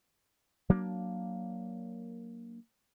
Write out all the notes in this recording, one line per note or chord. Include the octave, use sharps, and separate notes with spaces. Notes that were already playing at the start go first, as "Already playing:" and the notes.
F#3 A#3 D4